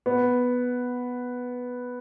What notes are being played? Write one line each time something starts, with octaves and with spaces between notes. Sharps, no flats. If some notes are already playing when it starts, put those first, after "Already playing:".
B3